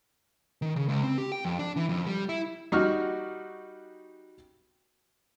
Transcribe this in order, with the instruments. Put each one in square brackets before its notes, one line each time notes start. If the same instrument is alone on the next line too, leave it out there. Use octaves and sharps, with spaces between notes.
[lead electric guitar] D#3
C#3
C#2
C4
G4
G5
F2
D4
E3
F2
G3
E4
[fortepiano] G3 D#4 F#4 C#6 F6